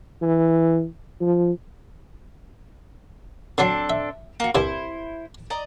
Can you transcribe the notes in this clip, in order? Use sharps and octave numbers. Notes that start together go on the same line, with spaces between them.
E3
F3
D3 F#3 C4 D4 A4
E5
A#3 F#4
C2 G2 C3 E4 C5
D5 D#5 A#5